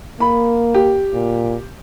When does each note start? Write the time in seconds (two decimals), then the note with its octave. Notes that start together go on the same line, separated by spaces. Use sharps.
0.20 A#3 B5
0.75 G4
1.14 A#2